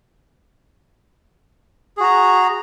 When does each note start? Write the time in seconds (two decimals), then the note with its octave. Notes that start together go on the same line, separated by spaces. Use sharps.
1.97 G#4
2.00 F#4
2.03 A#5